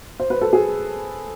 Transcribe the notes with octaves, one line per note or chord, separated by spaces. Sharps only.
C5
B4
A4
G#4